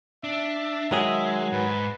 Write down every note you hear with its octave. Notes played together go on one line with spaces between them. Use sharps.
D4 E5
D#3 F#3 G#3 G#4
G#2 B4